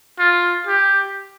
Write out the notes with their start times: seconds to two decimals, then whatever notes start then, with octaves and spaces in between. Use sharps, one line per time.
0.19 F4
0.67 G4